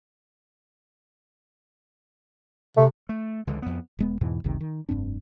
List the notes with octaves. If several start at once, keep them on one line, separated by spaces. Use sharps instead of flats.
C3 A3
A3
C#2 D3 E3 G#3
F2 B3
E1 G#3 B3
E2 G#2 B2 E3
F#1 C#2 C3 D#3
D#3
F1 G2 C4 D4